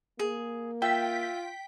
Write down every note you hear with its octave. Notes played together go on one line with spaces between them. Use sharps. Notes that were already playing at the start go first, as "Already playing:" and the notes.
A#3 G#4
F4 E5 G5 B6